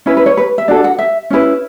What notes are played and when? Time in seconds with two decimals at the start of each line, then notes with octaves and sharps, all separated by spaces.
0.06 C#4 E4 B4
0.17 B4
0.26 C#5
0.37 B4
0.58 E5
0.68 D4 F#4 A4 D5
0.84 F#5
0.99 E5
1.30 C#4 E4 B4